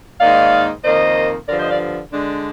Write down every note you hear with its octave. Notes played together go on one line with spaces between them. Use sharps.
G#2 D#3 A#3 D#4 D5 F5
F2 D#3 A#3 C5 D#5
G2 D3 F3 A#4 D5
C5 D#5
D5 F5
D3 G#3 D4